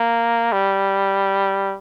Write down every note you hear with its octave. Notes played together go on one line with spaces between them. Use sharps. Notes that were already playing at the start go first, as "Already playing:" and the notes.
Already playing: A#3
G3